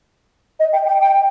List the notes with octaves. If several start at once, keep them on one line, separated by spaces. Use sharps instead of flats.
D#5
G5
G5
G5